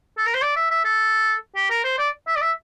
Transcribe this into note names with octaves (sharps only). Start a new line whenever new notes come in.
A4
A#4
C5
D5
E5
E5
A4
G4
A#4
C5
D5
E5
D5
E5